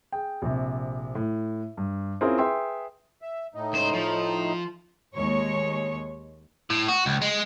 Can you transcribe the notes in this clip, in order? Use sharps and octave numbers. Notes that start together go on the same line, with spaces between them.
G#4 G5
A#1 C3
A2
G2
C4 C#4 E4 F4 G#4 A#4
G#4 B4 E5 G5 C6 E6
E5
A2 D#4
C#2 C5
F3
D#2 G#3 C#5
A2
F#4
C#2
G#3